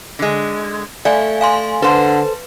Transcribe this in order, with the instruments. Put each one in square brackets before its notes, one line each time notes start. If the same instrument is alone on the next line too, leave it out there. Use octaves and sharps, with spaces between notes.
[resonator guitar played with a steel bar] D3 G#3
[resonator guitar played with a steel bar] A3 [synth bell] D5 F5 G#5
[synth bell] F5 G#5 C6
[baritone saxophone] D3 [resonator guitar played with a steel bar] A4 C5 [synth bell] B4